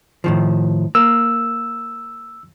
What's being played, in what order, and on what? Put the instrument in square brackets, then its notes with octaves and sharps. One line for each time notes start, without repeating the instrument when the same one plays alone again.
[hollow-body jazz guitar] A2 D#3 F3
[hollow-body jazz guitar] A#3 [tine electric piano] E6